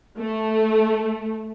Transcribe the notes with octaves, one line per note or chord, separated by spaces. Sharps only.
A3